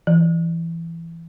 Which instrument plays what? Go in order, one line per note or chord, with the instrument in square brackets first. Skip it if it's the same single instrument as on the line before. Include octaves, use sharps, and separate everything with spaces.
[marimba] E3